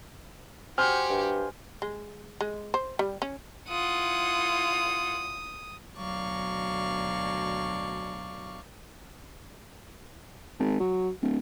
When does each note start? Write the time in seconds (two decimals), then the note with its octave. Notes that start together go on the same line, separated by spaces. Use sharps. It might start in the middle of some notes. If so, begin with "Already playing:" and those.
0.78 F#4 G4 C5 G#5 C6 F6
1.09 G2
1.82 G#3
2.41 G#3
2.74 C5
2.99 G3
3.22 C#4
3.69 E4 F4 F#5 D#6
5.98 D2 B2 F#3 D5 F5 C#6
10.59 G#1
10.80 F#3
11.22 D1